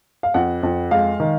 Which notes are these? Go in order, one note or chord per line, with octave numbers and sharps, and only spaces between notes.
F5
F2 F#5
F2
G#3 F5
D#3